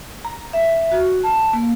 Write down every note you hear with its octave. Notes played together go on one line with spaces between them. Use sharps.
A#5
E5
F#4
A5
A#3